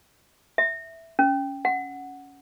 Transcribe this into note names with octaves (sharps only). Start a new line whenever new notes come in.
E5
C#4
F#5